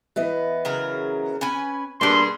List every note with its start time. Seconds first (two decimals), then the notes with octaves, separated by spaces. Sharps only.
0.16 E3 B3 D#5
0.65 C#3 F#3 A#4
1.41 C#4 B4 G#5
2.01 G2 B2 A#3 G#4 C6